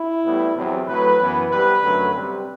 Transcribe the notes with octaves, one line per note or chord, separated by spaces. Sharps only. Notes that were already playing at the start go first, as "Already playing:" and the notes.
Already playing: E4
A2 G3 B3
E2 C3 F#3 C4
A2 F#3 A3 B4
F#2 E3 B3
C3 G3 B3 B4
F#2 D3 F#3 A3
C3 G3 C4